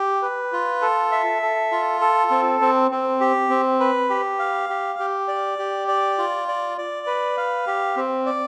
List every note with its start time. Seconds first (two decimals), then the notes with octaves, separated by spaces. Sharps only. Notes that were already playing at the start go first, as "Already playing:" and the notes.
Already playing: G4
0.22 B4
0.53 F4
0.82 A4
1.12 E5
1.42 A4
1.71 F4
2.01 A4
2.31 C4
2.61 C4
2.91 C4
3.20 G4
3.50 C4
3.80 B4
4.10 G4
4.39 F5
4.69 G4
4.99 G4
5.28 D5
5.58 G4
5.88 D5
6.18 F4
6.48 D5
6.78 D5
7.07 B4
7.37 F5
7.67 G4
7.97 C4
8.26 D5